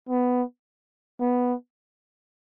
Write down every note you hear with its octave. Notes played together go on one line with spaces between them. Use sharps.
B3
B3